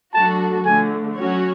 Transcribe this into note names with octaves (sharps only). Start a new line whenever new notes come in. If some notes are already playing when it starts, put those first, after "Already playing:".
F#3 A3 D4 F#4 A4 A5
D3 F3 A3 G#5
F#3 C#4 F#4 C#5